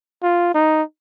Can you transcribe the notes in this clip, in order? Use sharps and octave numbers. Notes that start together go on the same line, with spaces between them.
F4
D#4